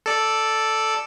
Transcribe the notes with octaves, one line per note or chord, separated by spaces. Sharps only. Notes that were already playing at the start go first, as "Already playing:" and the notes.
A4 D5